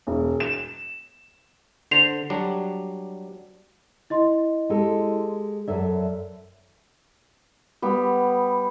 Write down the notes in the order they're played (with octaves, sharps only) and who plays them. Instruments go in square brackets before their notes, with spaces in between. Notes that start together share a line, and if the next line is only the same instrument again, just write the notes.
[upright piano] E1
E7
[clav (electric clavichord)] D3 C5 [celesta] C7 F7
[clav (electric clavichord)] F#3 G3 D4
[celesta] E4 D#5 C6
[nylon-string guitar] G#3 G4 A4
[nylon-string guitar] F#2 A4 E5 [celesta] D5
[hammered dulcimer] G3 B3